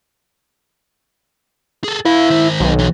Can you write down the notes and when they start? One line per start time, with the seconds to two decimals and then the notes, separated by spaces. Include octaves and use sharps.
1.84 G#4 A4
2.05 E4 B4 F5
2.30 D#3 C5
2.60 B1
2.79 D3 E3